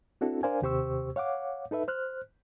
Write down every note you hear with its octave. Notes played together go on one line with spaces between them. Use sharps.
C4 D4 E4 F#4 A4
D4 A#4 C5 D5 F5 G#5
D#2 C3 G4 C5 C#6 E6
C#5 F5 F#5 D6
D#4 A4 B4 E5
C5 F6 F#6